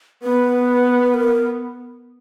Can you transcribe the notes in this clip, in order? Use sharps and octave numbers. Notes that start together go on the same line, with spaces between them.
B3 B4
A#4